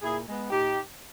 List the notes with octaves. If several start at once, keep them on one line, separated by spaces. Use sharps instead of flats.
A#2 E4 G#4
G#3 B3
A#2 D#4 G4